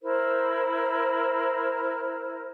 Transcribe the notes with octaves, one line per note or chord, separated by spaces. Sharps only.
E4 A#4 C5